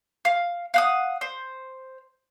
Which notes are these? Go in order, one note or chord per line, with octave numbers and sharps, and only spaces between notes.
F5
F5 F#5 D#6
C5